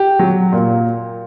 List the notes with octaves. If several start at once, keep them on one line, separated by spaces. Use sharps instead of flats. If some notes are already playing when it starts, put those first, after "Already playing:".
Already playing: G4
F#3
A#2